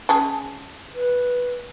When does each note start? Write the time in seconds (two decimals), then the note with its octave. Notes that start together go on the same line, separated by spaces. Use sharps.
0.09 C#4 G#4 A5
0.95 B4